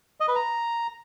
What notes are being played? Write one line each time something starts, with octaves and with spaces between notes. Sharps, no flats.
D#5
B4
A#5